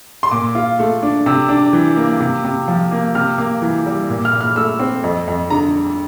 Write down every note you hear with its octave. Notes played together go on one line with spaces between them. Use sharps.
C6
A#2 D6
F4
A3
D4
C3 E6
D4
E3
A#3
C3
C3
F3
A#3
C3 F6
A#3
E3
G3
A#2
F6
A#2
F6
A3 E6
C4
F2
F2
D3 A#5